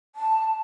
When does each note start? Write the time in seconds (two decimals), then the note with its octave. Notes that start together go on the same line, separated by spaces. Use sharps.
0.16 A5
0.47 A5